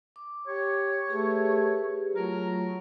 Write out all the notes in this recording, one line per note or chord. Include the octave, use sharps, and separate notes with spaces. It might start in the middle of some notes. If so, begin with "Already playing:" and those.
D6
G4 C#5
A3 G4 G#4 B4
F#3 A3 F4 A#4